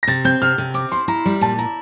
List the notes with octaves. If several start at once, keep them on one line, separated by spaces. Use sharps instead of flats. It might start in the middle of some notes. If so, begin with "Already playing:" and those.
A#6
C3 A6
C4 G6
C3 F6
C3
C4 D6
E4 C6
E4 A#5
G3
A#2 A5
E4 A#5